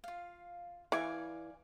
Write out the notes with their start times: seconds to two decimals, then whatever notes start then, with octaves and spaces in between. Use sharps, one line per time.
0.04 F4 F5
0.92 E3 D5 F5 G#5